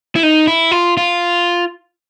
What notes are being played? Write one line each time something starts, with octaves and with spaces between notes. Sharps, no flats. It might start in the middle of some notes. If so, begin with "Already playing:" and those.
E4
D#4
E4
F4
F4